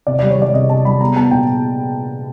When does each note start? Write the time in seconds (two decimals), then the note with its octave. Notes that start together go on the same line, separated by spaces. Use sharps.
0.07 C3 D5
0.19 D5
0.22 G3
0.30 C#5
0.39 G3 D5
0.54 C3 D#5
0.70 C3 A5
0.85 G3 B5
1.01 B3 A#5
1.16 B3 A5
1.31 A#2 G5